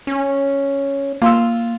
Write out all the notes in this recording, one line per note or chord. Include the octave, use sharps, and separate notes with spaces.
C#4
A#3 F4 C6 E6